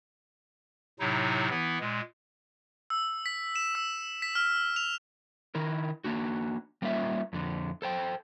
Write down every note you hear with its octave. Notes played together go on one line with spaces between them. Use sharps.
A2 C3 F#3 D#4 E4
E3 B3 E4
A#2 G#3
E6
B6
E7
E6
B6
F6
F7
D#3 E4 A#4
A#3 D4 F#4
G3 A#3 C#4 F4 E5
F2 D3
A4 C5 G5